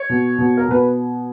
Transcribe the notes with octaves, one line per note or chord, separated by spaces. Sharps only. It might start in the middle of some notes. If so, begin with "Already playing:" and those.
Already playing: C#5
B2
B2
A#4
B2 B4